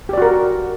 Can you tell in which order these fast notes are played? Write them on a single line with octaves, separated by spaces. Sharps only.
G4 D5 F#4 A#4